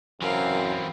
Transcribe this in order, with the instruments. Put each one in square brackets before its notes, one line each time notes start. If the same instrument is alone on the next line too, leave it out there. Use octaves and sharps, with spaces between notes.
[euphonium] F#2 [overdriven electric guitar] E3 C4 [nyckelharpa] A#4 F5